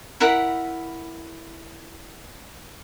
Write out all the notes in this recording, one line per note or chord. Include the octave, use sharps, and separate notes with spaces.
E4 A#4 F#5 B5